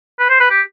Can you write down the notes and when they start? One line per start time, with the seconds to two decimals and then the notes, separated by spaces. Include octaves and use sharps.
0.19 B4
0.30 C5
0.40 B4
0.50 G4